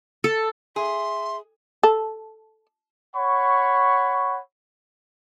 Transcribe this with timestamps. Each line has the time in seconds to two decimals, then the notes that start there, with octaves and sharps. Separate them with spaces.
0.24 A4
0.76 G#4 E5 C6
1.83 A4
3.16 C#5 F#5 B5 C#6